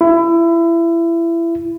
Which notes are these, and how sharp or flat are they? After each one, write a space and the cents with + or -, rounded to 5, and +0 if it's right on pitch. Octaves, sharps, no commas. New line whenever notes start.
E4 +25